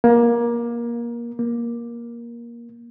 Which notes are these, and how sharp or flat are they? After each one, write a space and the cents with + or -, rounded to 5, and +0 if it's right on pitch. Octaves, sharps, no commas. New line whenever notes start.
A#3 +20
A#3 +15